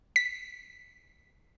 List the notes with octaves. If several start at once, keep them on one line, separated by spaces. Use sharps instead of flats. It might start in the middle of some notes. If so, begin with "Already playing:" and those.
B6